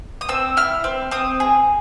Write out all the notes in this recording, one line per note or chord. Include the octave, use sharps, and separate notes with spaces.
D#6
C4 E6
E4 F6
C4
C4 D#6
G#4